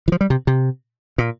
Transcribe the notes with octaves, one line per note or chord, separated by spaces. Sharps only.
E3
F3
G3
C3
C3
A#2